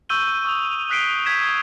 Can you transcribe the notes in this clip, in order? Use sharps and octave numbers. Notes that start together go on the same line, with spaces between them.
C#6 E6 G6 D#7 G7
C#6 D#6 E6 F7
D#6 F#6 B6 C7 D7 G7
G6 G#6 B6 E7
D#6 G#6 G7